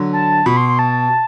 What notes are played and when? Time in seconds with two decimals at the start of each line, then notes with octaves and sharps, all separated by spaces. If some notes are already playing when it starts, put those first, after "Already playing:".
Already playing: D3 F#3
0.13 A5
0.46 B2 B5
0.57 C6
0.68 C6
0.79 A5